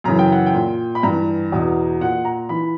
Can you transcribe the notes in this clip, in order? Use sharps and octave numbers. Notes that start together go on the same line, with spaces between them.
F#2 C#3 E3 A#5
G5
F#5
G5
A#2
B5
G2 E3 A#5
E2 B2
A#2 F#5
A#5
E3 B5